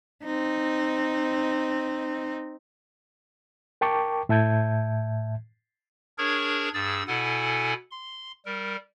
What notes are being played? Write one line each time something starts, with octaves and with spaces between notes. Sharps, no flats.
C4 D#4
A#4 G5 A5 C#6 D6
A2 E5 A5 G6 G#6
D4 G#4 A#4 C#5 C#6 G#6
G2 G#4 E6 A6
B2 E4 A4 F#5 G#5
C6
G3 A#4